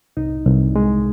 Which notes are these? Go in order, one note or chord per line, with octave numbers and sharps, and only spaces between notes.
C2 D#4
C2
G#3